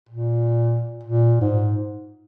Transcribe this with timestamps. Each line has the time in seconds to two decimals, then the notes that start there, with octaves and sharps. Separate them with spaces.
0.09 A#2
1.03 A#2
1.41 G#2